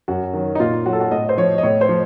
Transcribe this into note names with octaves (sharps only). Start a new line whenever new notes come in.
F#2 F#4
D#3 F#3
D#4
A#2 F4
F#3 F#4
A4
F#4
A2 D#5
C5
F3 C#5
D#5
A2 C#5
C5
F3